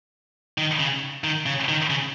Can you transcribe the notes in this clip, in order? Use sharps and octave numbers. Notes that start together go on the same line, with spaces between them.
D#3
C#3
D#3
C#3
D#3
C#3